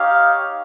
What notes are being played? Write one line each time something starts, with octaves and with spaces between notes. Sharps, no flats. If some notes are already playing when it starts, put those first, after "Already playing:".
Already playing: D#4 G4 C#5 F5